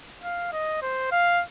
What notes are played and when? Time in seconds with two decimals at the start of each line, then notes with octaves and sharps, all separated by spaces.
0.23 F5
0.52 D#5
0.82 C5
1.11 F5